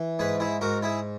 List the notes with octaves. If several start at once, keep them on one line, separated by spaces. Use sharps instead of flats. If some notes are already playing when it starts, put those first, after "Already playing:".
Already playing: E3
G#2 G#4 B4
E4 G#4
G#2 F#4 A#4
E4 G#4